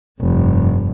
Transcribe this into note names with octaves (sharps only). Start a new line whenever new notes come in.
F1 G2